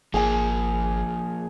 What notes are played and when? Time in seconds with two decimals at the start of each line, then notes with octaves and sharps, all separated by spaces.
0.14 G#1 F3 A#3 G#4 G#5